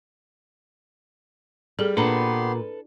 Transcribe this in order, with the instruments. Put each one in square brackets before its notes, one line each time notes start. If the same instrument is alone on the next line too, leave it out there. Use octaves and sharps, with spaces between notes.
[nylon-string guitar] G3 [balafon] G#4 A4
[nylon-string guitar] A#2 [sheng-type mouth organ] B3 G4 C6 [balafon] D4 A#5 [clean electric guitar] A4 B4